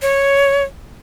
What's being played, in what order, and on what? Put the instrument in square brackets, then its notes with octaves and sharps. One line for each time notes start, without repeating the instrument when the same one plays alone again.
[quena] C#5